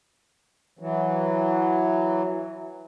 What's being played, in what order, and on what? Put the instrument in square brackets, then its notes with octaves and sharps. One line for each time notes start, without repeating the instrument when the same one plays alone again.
[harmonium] E3 F#3